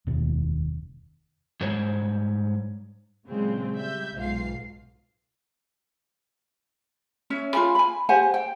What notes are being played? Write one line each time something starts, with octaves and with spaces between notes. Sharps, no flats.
F1 D#2 B2 D#3
G#2 G3 C5 C#5
A#2 C#3 F#3 G#3 C4
G3 E5 G6
B1 G#2 B2 F4 F5 C7
C#4 C#5 E5
F4 A#4 G#5 B5
G#5 B5
G4 C5 F#5 G#5
G5